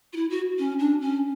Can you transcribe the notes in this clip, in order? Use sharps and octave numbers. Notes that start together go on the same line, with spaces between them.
F4
E4
F#4
C#4
D4
C#4